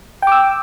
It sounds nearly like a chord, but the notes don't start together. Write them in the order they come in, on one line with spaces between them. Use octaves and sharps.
G5 D6 E6